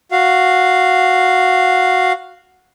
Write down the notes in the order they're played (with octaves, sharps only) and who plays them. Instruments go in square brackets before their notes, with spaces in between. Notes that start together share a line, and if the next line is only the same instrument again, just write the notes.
[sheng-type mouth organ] F#4 F5